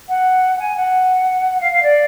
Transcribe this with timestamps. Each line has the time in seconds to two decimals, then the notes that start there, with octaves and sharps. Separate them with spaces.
0.08 F#5
0.58 G#5
0.76 F#5
1.60 F5
1.71 F5
1.82 D5